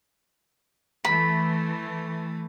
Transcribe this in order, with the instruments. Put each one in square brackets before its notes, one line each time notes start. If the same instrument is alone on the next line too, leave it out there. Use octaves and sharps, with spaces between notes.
[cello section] E3 A3 [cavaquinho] B5